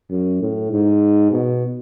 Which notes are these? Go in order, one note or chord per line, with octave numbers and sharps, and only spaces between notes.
F#2
A2
G#2
B2